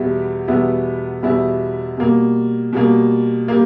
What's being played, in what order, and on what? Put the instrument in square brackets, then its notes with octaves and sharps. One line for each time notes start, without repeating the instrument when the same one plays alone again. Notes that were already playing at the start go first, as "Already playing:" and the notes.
Already playing: [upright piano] E2 B2 G3 B3 E4
E2 B2 G3 B3 E4
E2 B2 G3 B3 E4
B2 G3 A#3
B2 G3 A#3
G3 A#3